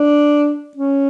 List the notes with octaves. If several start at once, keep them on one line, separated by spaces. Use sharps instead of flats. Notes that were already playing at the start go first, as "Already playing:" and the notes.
Already playing: D4
C#4